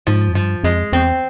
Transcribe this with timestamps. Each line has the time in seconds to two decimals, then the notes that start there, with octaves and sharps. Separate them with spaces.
0.07 G#2 F3
0.29 F2
0.35 G2 F3
0.64 F2 G#3
0.93 E2 C4